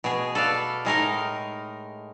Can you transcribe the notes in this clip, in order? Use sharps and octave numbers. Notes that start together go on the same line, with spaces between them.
B2 G#4
A4 B4 D5 F5
A2 G#3 D#4 A#4